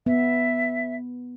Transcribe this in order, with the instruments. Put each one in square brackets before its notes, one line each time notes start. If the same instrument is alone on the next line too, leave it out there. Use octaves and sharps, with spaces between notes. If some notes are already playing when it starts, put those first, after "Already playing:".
[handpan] B3 [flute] E5